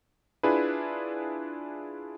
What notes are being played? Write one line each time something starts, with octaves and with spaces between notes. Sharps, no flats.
D4 E4 F4 G#4 B4